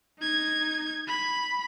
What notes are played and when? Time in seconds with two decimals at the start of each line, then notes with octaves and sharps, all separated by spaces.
0.19 D#4 G#6
1.07 B5